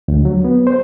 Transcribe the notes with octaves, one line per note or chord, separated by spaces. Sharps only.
D2
F#3
B3
C5